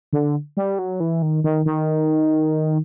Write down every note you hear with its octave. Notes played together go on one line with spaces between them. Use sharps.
D3
G3
F#3
E3
D#3
D#3
D#3